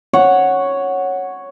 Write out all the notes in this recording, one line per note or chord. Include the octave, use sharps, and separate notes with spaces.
C#5 F#5